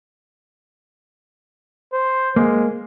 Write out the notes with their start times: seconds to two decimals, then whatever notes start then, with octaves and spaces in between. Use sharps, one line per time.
1.93 C5
2.36 G#3 A#3